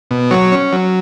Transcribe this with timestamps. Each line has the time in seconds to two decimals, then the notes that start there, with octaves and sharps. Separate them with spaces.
0.11 B2
0.31 F#3 C#5
0.52 C#4
0.73 F#3